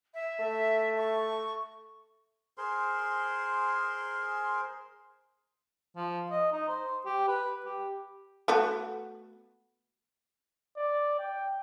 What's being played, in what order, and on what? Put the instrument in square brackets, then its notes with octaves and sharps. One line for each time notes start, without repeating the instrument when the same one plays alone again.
[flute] E5
[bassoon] A3
[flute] C#6
[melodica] G#4 A#4 C5 C6
[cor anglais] F3
D#5
D#4
C5
G4
B4
G4
[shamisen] A3 B3 F#4
[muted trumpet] D5
G5